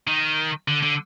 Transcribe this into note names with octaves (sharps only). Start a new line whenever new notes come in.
D#3
D3
D3